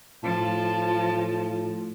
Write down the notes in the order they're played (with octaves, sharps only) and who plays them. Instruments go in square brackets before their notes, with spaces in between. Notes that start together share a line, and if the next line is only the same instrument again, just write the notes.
[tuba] A2 [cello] F3 [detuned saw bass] F4 [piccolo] A5